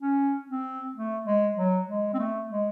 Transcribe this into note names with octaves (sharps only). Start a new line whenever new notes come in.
C#4
C4
A3
G#3
F#3
G#3
C4
A3
G#3